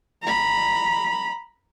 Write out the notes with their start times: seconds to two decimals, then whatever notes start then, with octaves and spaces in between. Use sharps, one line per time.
0.22 A#5 B5